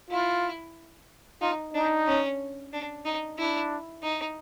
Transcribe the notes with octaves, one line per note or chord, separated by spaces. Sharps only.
E4 F4
D#4 F4
D4 D#4
C#4
D4
D#4
D4 E4
D#4